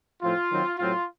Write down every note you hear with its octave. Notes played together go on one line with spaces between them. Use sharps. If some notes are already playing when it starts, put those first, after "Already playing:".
A2 F3 C4 F4
D#3 F#3 C4
A2 F#3 C4 F4